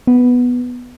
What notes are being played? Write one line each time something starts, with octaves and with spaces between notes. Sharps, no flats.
B3